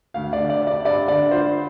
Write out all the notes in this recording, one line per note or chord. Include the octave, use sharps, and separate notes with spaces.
D2 F5
D5
D3
D5
D4
D5
G2 D5
D3 D5
F4 C5